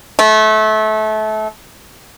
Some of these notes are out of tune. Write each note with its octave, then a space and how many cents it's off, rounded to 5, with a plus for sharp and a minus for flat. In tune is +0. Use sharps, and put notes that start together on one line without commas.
A3 -25